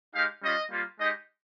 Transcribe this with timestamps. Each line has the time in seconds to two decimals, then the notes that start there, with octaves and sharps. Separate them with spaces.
0.14 G#3 D#4 G4 F5
0.42 G3 C#4 F4 D#5
0.71 G3 A#3 F4
0.99 G#3 D#4 G4 D#5